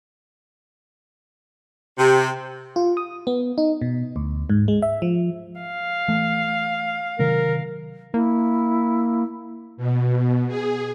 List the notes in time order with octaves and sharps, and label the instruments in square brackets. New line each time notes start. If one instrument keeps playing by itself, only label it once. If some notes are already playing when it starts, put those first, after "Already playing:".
[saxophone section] C3
[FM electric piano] F4
D#6
B3
D#4
B2
D2
G#2
G#3
E5
F3
[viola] F5
[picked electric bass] E3 A3
[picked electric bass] C3 D#3 F#3 [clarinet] A#4
[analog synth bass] A#3 [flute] E4
[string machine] B2
G#4